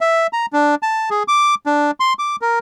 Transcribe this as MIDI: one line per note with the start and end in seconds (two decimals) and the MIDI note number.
0.01 0.27 76
0.33 0.46 82
0.53 0.75 62
0.83 1.09 81
1.10 1.23 68
1.28 1.55 86
1.66 1.91 62
2.00 2.13 84
2.19 2.36 86
2.41 2.59 70